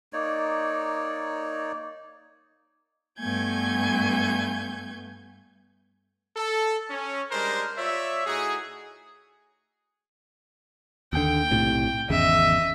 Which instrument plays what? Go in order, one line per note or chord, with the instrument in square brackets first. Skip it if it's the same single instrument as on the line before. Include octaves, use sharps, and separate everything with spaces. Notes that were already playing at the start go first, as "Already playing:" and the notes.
[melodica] A#3 D#4 C#5 D5
[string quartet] G2 A3 B3 G#5 G6 G#6
[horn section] A4
C#4
G3 G#3 D4 A#4 C5
F4 C#5 D5 E5
A2 D#4 F#4 G#4
[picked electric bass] D#2 D3 [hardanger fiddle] G5
[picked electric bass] B1 A2 C3
[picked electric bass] G#1 E2 C#3 [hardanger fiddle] D#5 E5